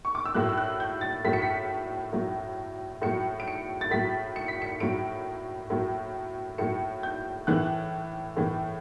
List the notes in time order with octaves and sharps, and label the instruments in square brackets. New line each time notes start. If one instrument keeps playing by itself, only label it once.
[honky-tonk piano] C#6
D6
E6
A2 F#3 F#6
E6
F#6
G6
A6
A2 F#3 B6
C#7
B6
A2 F#3
A2 F#3 C#7
D7
C#7
A6
A2 F#3 B6
C#7
B6
C#7
A2 F#3 D7
A2 F#3
A2 F#3 C#7
G6
A2 E3 F#6
A2 E3